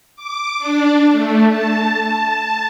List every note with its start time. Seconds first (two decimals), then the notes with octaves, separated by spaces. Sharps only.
0.16 D6
0.58 D4
1.12 A3
1.50 A5